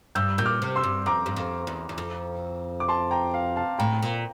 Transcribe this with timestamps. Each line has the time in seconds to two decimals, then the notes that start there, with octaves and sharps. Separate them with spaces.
0.15 G2 E6 G6
0.38 A#2 G6
0.46 D6 F6
0.62 C3
0.76 C6 E6
0.84 G2
1.06 F2 A#5 D6
1.26 G2
1.36 F2
1.67 E2
1.89 E2
1.98 F2
2.80 D6
2.88 A5 C6
3.11 G5 A#5
3.34 F5
3.56 F5 A5
3.79 A2 G5 A#5
4.02 A#2